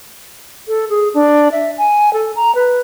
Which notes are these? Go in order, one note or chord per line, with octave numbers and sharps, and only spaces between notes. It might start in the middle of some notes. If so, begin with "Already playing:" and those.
A4
G#4
D4
E5
G#5
A4
A#5
B4